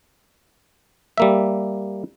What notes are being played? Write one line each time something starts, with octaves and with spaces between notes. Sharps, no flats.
G3 A#3 E5